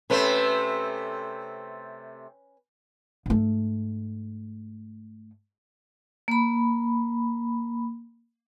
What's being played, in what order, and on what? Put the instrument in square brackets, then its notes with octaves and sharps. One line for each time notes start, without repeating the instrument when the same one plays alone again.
[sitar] C3 A3 C4 [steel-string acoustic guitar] C#4 B4
[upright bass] G#2 A3
[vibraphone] A#3 B5